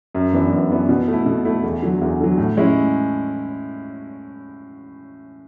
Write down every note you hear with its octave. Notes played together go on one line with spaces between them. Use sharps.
F#2
E3 B3 D4
F#2
E3 B3 D4
B2
A3 E4
B2
A3 E4
E2
D3 F#3
E2
D3 F#3
A2
G#3 C#4 E4